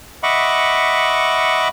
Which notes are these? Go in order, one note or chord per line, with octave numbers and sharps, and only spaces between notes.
D#5 E5 F#5 B5 C#6 D6